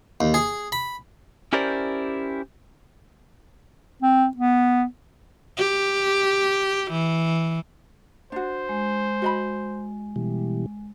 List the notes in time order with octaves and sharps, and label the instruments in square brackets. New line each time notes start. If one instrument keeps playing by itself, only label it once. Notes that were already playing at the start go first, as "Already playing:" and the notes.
[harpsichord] D#2
G#4
B5
[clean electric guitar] C#4 E4 G4 A#4 C5 D5
[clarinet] C4
B3
[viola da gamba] G4
E3
[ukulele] D4 F#4 [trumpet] C5
[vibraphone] G#3
[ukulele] F#4 D#5 B5
[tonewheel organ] B2 E3 G3